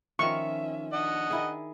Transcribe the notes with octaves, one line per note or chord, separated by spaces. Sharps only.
D#3 F3 C#4 E5 F5 C#6
D4 D#5 F#5
D#3 E4 G#4